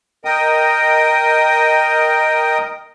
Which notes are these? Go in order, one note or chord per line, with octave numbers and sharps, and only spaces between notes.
A#4 D#5 G5 D#6